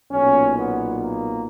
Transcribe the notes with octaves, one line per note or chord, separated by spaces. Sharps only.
B1 A#2 C#4
B3
A#3